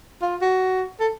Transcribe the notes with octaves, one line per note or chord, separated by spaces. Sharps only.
F4
F#4
A4